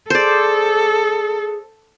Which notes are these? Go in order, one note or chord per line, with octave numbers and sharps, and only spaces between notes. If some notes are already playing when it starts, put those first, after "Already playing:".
G#4 A4 C5 D5